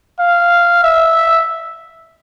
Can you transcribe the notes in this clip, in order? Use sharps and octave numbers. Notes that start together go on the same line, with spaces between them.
F5
E5